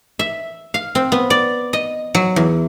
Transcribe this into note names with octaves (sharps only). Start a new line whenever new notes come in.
E5
F5
C4
B3
D5
D#5
F#3
E2